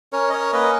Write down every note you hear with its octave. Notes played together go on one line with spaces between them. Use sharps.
C#4 A#4 C#5
D#5
A#4 C#5
A#3 B4 D#5